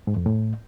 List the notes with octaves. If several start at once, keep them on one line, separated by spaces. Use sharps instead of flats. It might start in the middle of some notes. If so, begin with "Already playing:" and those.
G#2
F2
A2